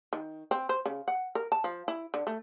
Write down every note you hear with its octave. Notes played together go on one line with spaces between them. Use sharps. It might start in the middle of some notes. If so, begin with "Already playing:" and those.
D#3
C4
C5
C#3
F#5
A#4
A5
F3
E4
D3
A3